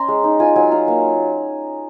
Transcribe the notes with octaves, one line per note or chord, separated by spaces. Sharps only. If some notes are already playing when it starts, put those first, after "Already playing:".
Already playing: C#4 G#5 A#5 C6
G#3
D#4
F4 G#5
F#3 G#5
F4 A#5
A#3